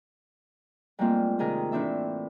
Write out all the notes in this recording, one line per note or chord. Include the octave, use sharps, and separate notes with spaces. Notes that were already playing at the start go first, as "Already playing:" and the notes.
G#2 G3 A3 A#3 C4 F4
C3 D#3 G#4 A#4
A2 E3 C4 D4 E5